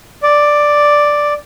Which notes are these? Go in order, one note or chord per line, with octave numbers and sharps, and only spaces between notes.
D5